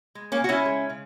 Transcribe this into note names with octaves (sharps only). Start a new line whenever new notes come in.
G#3
A#3 C#4
C#3 F#4
C#4 E4
G#3
C#3